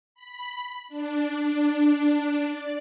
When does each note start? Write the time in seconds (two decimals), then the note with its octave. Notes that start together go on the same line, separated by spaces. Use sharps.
0.15 B5
0.88 D4
2.46 D5